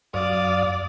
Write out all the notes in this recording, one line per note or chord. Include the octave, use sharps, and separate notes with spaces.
F#2 D5 F5 D#6